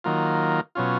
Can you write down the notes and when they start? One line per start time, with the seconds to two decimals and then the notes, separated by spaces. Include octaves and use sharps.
0.04 D#3 F#3 A#3 F4
0.75 B2 F#3 C#4 F4